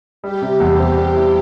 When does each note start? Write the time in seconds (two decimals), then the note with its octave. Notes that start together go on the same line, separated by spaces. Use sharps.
0.23 G3 G4
0.42 C3
0.60 E2
0.78 C4
0.97 G3
1.15 E4